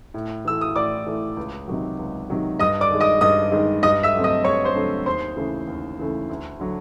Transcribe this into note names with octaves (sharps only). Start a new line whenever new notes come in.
A2
E3 A3 E6
D#6
A2 D5 D6
E3 A3
C#2
C3 D#3 F#3
C#2
C3 D#3 F#3
G2 D#5 D#6
D5 D6
D#3 G#3
D#5 D#6
G2 D#5 D#6
D#3 G#3
G2 D#5 D#6
E5 E6
D3 F#3 A3 C4
D#5 D#6
G2 C#5 C#6
C5 C6
D3 F#3 A3 C4
D#2 C5 C6
C#3 E3 A3
D#2
C#3 E3 A3
D2
D3 F#3